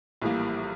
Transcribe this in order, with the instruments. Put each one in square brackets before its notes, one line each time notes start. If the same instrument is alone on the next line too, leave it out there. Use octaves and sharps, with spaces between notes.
[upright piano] A#1 A2 E3 G3 A#3